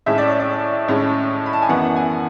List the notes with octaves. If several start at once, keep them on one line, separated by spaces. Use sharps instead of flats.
A2 G#3 C#4 E5
D5
C#5
D5
A2 G#3 C#4
B5
A5
G#5
F#2 E3 B3 F#5
G#5